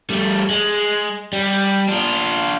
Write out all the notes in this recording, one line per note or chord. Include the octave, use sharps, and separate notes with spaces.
G3 A3
G#3
G3
D4 F4